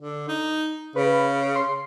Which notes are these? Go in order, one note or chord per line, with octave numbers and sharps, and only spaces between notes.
D3
D#4
C#3 B4
C6